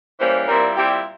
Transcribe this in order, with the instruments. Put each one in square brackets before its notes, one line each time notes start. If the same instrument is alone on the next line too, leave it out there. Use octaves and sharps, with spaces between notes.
[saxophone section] E3 G3 A#3 C#4 [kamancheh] C5
[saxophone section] A#2 G3 C4 E4 [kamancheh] A#4
[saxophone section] A#2 G3 C4 E4 [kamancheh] G4